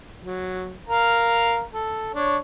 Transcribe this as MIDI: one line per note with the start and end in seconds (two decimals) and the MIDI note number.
0.24 0.75 54
0.89 1.63 70
0.89 1.63 77
0.89 1.63 82
1.74 2.14 69
2.14 2.38 62
2.14 2.38 73